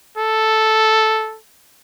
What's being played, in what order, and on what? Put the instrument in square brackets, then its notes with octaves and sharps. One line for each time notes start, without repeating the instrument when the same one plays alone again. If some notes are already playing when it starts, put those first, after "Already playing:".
[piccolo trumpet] A4